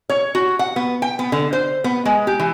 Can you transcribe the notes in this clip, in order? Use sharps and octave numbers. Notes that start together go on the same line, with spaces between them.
C#5
F#4
F#5
B3
G5
B3
D3
C5
B3
G#3
G4
E3